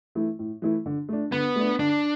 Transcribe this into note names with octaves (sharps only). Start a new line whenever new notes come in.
E3 A3 E4
A2
E3 A3 E4
D3
A3 D4
D3 B3
A3 D4
D3 D4